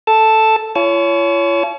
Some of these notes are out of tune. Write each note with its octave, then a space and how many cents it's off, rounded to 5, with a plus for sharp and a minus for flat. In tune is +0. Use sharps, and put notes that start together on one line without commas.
A4 +0 A5 +0
F4 -45 C#5 +20 A5 -35